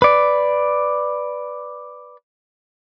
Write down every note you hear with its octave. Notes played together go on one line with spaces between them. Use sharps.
B4 D5